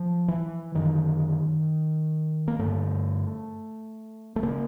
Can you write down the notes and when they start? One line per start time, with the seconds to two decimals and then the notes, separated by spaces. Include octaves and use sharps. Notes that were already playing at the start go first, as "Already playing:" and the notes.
Already playing: F3
0.28 E3
0.74 F#2 D3 D#3
2.48 A#3
2.59 G2 D3 A3
4.36 A3
4.43 C#3 A#3